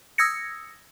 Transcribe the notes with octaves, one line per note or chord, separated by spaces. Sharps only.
D#6 E6 G#6 A#6 C#7